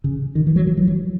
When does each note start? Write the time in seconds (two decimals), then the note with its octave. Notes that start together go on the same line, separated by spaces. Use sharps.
0.04 C#3
0.35 D#3
0.47 E3
0.56 F#3
0.67 F#3
0.77 E3
0.88 F#3